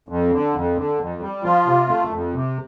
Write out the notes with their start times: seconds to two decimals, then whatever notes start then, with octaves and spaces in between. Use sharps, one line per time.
0.09 F2
0.32 D3
0.54 F2
0.76 D3
0.99 F2
1.21 G3
1.43 F3 F4
1.66 C3
1.89 A3
2.11 F2
2.34 C3